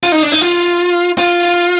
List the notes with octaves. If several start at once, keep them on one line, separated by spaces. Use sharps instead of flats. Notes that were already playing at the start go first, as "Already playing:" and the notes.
F4
D#4
D4
D#4
F4
F4